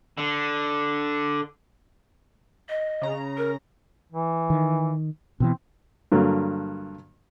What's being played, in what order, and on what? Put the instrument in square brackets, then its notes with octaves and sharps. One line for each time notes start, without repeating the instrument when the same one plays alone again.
[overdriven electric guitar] D3
[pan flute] D#5
[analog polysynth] C#3 A#5
[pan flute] A#4
[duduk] E3
[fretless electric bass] D#3
[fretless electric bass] B2 D3 E3 [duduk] C4
[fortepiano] G2 D3 F#3 A#3